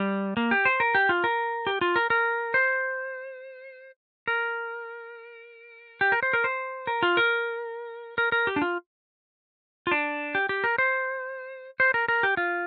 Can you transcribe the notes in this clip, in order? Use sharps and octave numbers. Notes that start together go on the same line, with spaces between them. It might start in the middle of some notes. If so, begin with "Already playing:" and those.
Already playing: G3
A#3
G4
C5
A#4
G4
F4
A#4
G4
F4
A#4
A#4
C5
A#4
G4
A#4
C5
A#4
C5
A#4
F4
A#4
A#4
A#4
G4
D4
F4
F4
D4
G4
G4
A#4
C5
C5
A#4
A#4
G4
F4